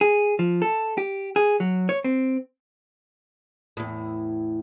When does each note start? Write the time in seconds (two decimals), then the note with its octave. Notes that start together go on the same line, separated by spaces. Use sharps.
0.01 G#4
0.39 F3
0.62 A4
0.98 G4
1.36 G#4
1.60 F#3
1.89 C#5
2.04 C4
3.77 E2 A2